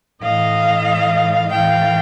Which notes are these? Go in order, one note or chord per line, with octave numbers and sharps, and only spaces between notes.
A2 E3 D#5 F5
A2 E3 F5 G5